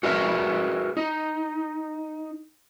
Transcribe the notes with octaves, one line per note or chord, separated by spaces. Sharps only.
F#4 G#4 A#4 B4 C#5 E5
D#4